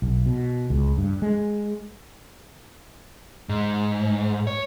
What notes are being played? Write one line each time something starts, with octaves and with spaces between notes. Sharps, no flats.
B1
B2
C#2
G2
G#3
G#2
C#5